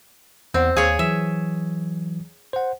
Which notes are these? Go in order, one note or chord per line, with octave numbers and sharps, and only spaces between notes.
E2 C4 F#5
D#2 G#4 C#5 F5
E3 F#3 E5
C5 F#5